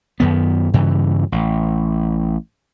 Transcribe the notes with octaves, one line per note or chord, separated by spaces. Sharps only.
F#2 D#3 B3
G2 C#3 E3
A1